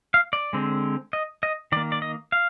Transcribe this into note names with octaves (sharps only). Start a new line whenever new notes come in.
F5
D5
D3 G#3 C4
D#5
D#5
D#3 A#3 D5
D5
D#5
F5